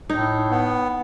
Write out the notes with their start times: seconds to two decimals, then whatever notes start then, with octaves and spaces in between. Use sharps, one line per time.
0.10 A2 D#4
0.51 B3